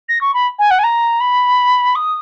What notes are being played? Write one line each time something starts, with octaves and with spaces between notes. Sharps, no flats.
A#6
C#6
B5
G#5
F#5
G#5
A#5
B5
D#6